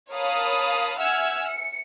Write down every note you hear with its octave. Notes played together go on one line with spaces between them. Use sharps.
A#4 C#5 F5 A5 B5 D#6
E5 F#5 G#5 E6 F6 G#6
C#7